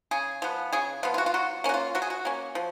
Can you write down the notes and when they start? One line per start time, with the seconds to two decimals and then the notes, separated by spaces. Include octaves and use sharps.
0.11 C#3 G#4
0.42 F3 B3
0.73 C#3 G#4
1.03 F3 B3 F4
1.14 F4
1.18 F#4
1.26 F4
1.34 F#3 F#4
1.64 A#3 C#4 F#4
1.74 F4
1.95 F#3 F#4
2.02 G#4
2.10 F#4
2.25 A#3 C#4
2.55 F3